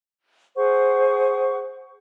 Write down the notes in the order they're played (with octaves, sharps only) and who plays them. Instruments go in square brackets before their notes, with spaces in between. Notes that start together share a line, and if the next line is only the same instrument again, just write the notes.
[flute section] G#4 C5 F#5 C#6